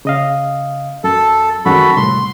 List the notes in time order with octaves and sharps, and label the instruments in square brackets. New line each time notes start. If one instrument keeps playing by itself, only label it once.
[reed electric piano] C#3 D#5 F5
[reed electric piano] F#2 [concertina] A4
[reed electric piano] F#2 D#3 G#3 [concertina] F#4 A4 B5
[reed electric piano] C2 A2 [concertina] C6